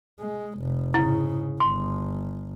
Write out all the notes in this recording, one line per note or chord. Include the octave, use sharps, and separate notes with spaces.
G#3
F1
G#2 C#3 E4
G1 C6